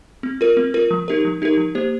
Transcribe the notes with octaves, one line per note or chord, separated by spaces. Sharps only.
C4
F4 A#4
C4
F4 A#4
F3
D#4 G4 A#4
F3
D#4 G4 A#4
F3
A#3 G4 C5